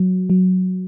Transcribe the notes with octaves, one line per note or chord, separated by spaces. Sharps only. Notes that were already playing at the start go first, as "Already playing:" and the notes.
Already playing: F#3
F#3